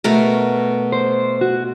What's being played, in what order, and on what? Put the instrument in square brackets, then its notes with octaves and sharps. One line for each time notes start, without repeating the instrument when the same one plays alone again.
[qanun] B2 A3 A#4
[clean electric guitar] C5
F#4